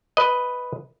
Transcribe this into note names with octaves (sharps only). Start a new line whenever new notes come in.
B4 D#5